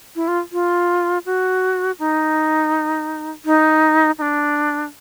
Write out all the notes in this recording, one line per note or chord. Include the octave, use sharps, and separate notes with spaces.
E4
F4
F4
F#4
D#4
D#4
D#4
D4